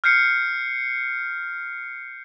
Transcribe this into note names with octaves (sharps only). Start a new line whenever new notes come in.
F6 G6 C7 C#7